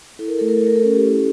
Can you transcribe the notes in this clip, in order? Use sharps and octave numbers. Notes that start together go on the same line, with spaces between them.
E4 A4
A#4
A3 A4
A#4
A4
A3 A#4
A4
C#4 A#4
G4 A4
E4